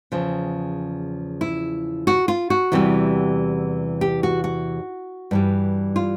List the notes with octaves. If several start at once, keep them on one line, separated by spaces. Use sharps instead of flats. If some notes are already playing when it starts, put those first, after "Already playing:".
E2 C#3 F3
E4
F#4
F4
F#4
E2 C3 E3 G3
G4
F#4
F#4
G2 E3 G3
F4